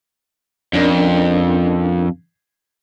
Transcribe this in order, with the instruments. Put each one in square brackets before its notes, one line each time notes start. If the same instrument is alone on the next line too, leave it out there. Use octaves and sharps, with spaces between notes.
[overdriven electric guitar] F2 [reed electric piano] C#4 D4 A#4